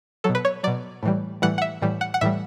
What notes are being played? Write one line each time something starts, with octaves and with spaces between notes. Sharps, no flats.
B2 F#3 A4
B4
C#5
B2 F#3 D5
A2 E3 G3
A2 E3 G3 F#5
F#5
E5
A2 E3 G3
F#5
F#5
A2 E3 G3 E5